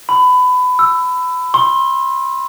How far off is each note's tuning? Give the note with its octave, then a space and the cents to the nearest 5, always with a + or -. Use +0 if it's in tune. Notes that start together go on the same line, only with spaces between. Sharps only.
B5 +25
E6 +10
C6 +35